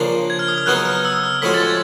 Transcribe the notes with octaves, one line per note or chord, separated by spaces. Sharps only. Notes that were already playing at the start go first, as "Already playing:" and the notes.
Already playing: C#3 F3 A#3 D4
G#6
F6
D#6
F6
C#3 F#3 B3 D#4 F#6
F6
E6
F6
A2 F3 G#3 C#4 F#4 B6
A6
G#6